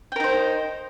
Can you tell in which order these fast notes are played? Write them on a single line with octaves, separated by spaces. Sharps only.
G5 A#4 D#4 C5